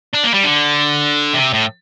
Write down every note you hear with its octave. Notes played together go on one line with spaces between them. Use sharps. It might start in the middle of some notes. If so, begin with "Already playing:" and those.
D4
A#3
G3
D3
C3
A2